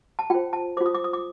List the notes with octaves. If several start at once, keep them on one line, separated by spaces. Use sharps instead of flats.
A5
F4 C5 G5
A5
F4 C5 D6
D#6
D6
D#6
D6